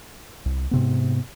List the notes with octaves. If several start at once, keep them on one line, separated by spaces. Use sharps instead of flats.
C2
G#2 C3 B3